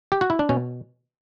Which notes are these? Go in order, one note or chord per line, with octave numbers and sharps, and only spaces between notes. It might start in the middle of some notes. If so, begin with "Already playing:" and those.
G4
F#4
E4
D4
B2 C#4